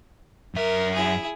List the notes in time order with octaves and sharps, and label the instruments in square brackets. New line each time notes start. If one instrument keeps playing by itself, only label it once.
[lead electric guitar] F#2 E5 [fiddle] A#4
[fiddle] E4 G#4